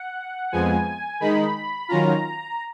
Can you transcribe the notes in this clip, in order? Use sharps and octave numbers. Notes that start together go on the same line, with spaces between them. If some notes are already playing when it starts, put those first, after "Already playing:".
Already playing: F#5
F2 F3 G#3 B3 G#5
D#3 G#3 D#4 B5
D#3 F#3 C#4 F4 A#5